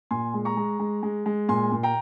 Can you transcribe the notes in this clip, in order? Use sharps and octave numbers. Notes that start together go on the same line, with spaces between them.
A#2 G#5 C6
G#3
A#5 C#6
G#3
G#3
G#3
G#3
A#2 G#5 C6
A#2
G5 A#5